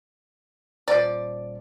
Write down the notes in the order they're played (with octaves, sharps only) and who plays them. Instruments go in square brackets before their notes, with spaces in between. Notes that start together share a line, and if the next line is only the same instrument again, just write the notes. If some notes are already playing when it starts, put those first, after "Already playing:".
[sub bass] D#1 [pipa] F3 D5